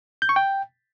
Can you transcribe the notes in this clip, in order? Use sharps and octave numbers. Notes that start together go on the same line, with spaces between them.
G6
C#6
G5